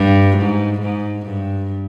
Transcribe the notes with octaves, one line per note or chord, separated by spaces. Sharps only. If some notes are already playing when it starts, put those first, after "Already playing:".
Already playing: G2
G#2
G#2
G2